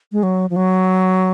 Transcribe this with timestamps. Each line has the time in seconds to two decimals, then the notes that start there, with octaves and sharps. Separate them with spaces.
0.12 G#3
0.23 F#3
0.50 F3
0.56 F#3